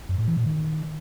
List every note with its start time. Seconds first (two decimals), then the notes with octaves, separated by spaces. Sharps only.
0.09 F#2
0.18 A2
0.27 E3
0.37 A#2
0.46 D#3